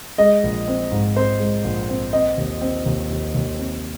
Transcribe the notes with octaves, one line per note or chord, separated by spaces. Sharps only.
G#3 D#5
A#1
C4
G#2
C4 C5
G#3
A#1
C4
C4 D#5
D#2
C4
D#2
D#2
D#2
C4